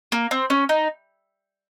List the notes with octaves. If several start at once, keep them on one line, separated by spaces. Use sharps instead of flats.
A#3
C4
C#4
D#4